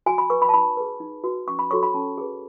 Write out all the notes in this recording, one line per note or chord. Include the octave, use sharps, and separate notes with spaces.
F#4 G#5
B5
B4 C#6
B5
A5
D#4 B5
G#4 B4
D#4
F#4 B4
C#4 C#6
B5
F#4 A4 C#5 C#6
B5
C#4 A5
G#4 B4